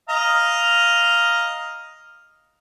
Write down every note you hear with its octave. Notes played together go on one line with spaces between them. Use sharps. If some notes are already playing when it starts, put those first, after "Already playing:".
D#5 F5 A#5